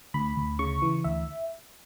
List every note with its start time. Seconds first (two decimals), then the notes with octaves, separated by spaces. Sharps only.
0.14 D2 B5
0.37 D2
0.59 C#3 C#6
0.82 E3
1.04 D2 E5